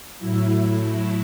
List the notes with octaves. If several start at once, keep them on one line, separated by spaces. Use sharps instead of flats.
A2 F#3 E4